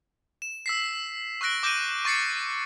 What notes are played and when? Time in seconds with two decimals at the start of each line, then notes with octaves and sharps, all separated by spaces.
0.42 E7
0.66 E6 B6 C7
1.41 C#6 E6 F#6 A#6 D7
1.63 D6 G6 A#6 D7 D#7
2.05 C#6 A6 C7 C#7